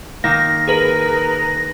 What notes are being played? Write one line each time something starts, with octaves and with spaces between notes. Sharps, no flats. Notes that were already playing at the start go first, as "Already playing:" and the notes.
D#3 A#3 A#6
G#4 A#4 B4